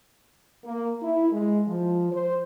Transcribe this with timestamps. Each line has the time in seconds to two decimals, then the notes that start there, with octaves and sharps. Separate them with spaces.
0.64 A#3
1.02 E4
1.32 G#3
1.68 F3
2.12 C5